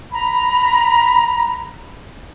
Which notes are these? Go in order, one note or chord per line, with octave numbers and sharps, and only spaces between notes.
A#5 B5